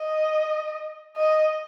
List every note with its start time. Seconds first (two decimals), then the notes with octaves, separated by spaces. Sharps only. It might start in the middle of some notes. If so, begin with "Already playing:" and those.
Already playing: D#5
1.17 D#5